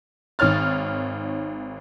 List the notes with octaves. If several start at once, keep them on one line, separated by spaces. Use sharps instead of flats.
G#1 D#3 C#5 F6 A6